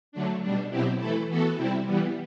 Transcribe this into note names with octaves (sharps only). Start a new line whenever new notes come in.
D3 F#3 A3 D4
B2 G3 D4
B2 F#3 C4 E4 G4
E3 A3 E4 A4
E3 B3 F#4 A4
C3 G3 C4 E4
E3 G3 B3